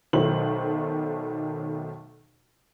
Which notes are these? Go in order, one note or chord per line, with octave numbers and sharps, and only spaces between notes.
B1 D#3 F#3 A3 C5 F#7